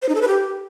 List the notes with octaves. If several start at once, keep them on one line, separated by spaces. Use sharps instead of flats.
C5
D#4
A4
B4
G4